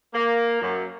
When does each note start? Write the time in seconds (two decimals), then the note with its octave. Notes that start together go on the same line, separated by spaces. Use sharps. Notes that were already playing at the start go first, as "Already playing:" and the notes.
0.14 A#3
0.61 F#2